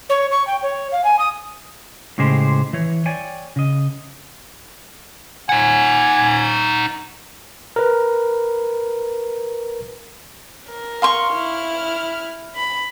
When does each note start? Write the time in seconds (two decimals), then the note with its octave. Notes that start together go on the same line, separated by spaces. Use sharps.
0.09 C#5
0.31 C#6
0.47 G5
0.63 C#5
0.92 F5
1.04 G#5
1.19 D#6
2.18 A2 C#3 G#3 G4 C5
2.73 E3 C#5
3.06 C#5 D5 G5 G#5
3.56 C#3 D#5
5.49 D#4 F#5 G#5
7.76 A#4 B4
10.69 A#4
11.02 F5 C6 C#6
11.31 E4 F6
12.55 B5